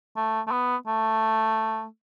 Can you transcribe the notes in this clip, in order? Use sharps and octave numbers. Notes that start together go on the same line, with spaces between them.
A3
A3
B3
A3